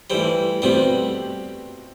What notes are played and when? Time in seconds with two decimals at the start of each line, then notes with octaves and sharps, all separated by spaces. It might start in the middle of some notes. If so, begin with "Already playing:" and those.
0.10 E3 G3 A3 E4 A4 C5
0.62 B2 G3 A3 B3 C4 F#4 C5